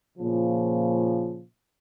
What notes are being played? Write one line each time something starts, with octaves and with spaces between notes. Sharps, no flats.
A#2 C#3 F3